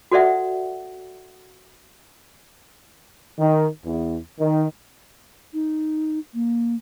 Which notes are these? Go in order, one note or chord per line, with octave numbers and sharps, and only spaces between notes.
F#4 A4 C5 D5 E5 F#5
D#3
E2
D#3
D#4
A#3